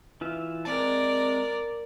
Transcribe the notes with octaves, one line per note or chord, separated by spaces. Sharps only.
E3 F4 E5
G#3 C4 A#4 D5 A5